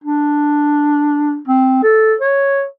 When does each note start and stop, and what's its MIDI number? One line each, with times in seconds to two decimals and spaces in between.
0.04 1.38 62
1.48 1.80 60
1.83 2.15 69
2.20 2.65 73